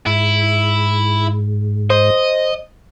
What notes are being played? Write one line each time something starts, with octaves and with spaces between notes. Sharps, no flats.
G#2 E4
C5 D#5